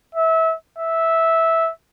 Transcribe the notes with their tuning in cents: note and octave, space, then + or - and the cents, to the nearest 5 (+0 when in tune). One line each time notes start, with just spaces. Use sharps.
E5 -25
E5 -10